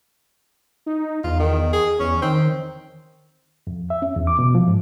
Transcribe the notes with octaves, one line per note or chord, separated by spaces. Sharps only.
D#4
E2 F4
D#3
G#4
E2 C#4
D#3 C4
F2
E5
C#4
E2
D6
B2
F3
G#2